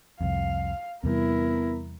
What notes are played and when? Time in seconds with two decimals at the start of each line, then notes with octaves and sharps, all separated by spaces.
0.21 C2 F2 F5
1.04 E2 C3 G3 B3 E4 A#4